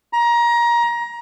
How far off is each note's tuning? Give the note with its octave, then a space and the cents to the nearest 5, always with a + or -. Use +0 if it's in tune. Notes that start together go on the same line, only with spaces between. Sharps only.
A#5 +25